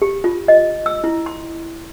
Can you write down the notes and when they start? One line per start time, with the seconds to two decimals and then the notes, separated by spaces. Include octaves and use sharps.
0.02 G4
0.24 F4
0.48 D#5
0.86 E6
1.04 E4
1.26 C6